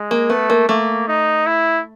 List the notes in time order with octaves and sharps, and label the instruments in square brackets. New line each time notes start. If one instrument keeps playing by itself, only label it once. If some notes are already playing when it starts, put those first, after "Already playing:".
Already playing: [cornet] G#3
[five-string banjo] A#3
[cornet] A3 [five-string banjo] B3
[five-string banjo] A#3
[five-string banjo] A3 [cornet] A#3
[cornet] D#4
E4